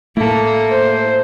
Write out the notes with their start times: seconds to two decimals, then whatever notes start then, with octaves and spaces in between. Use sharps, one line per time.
0.17 A2 A3 A#3 E4 A4
0.72 C5